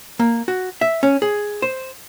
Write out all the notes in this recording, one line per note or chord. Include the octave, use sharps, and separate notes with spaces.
A#3
F#4
E5
C#4
G#4
C5